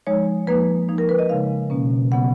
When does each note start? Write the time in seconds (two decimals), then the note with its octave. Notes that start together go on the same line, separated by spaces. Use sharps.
0.07 F3 G#3 D#4 C#5
0.47 F3 A#3 D#4 B4
0.89 F3 A#3 D#4
0.98 A#4
1.09 B4
1.19 D#5
1.29 C#3 G#3 D#4 F5
1.70 B2 A#3 C#4
2.11 C#3 F#3 B3 F#5